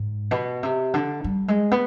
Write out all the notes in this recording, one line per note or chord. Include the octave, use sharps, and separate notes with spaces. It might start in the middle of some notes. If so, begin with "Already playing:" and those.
Already playing: G#2
B2
C3
D3
G3
G#3
B3